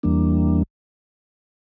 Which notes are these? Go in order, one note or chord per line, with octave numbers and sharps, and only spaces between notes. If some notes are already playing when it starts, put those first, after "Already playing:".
E2 E3 G3 A#3 D4